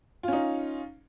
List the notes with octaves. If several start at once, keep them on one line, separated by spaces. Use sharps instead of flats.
C#4 D#4 F4